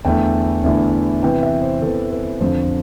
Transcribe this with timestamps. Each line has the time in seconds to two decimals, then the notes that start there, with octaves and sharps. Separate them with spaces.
0.05 E2 D3 A3 E4 G5
0.64 E2 D3 A3 E4
1.22 C3 E3 B3 G5
1.43 E5
1.62 C5
1.81 C3 E3 B3 A4
2.11 B4
2.40 F2 D3 F3 C5